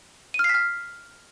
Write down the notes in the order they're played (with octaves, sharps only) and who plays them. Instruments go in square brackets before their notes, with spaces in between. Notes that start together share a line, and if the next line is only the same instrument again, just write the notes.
[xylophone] D#7
F6
C7
B6
F6